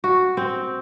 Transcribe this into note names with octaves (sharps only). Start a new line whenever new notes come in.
F#4
C4